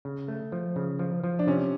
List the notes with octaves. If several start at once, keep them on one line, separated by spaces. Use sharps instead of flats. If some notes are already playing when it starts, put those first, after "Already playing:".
C#3
A3
F3
C#3
F3
F3
D4
C3 C#4